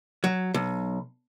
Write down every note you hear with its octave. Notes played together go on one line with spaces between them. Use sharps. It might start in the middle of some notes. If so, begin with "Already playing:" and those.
F#3
B1